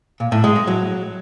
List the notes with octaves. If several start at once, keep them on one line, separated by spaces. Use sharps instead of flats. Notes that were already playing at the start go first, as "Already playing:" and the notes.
A#2
A2
G#3
G#3
F#3